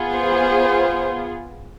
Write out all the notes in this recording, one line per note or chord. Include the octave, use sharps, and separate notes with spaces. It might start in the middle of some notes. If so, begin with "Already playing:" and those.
Already playing: B3 F4 G#4
C5